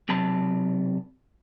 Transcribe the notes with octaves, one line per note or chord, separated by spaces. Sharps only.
B1 C3 F#3 A5 B5